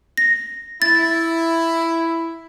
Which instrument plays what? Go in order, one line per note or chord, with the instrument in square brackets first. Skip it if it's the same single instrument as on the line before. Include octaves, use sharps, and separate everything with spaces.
[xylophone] A#6
[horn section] E4 [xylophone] A6